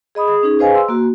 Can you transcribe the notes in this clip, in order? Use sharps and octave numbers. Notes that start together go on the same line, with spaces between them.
G#4 D#5 B5 D#6
G#4 D#6
C#4 D#4 G#4
G#4 B4 C5 D#5 F5 G#5
C6 E6
A#3 F#4